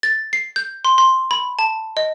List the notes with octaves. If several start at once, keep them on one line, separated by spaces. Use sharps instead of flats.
A6
C7
G6
C6
C6
B5
A5
D#5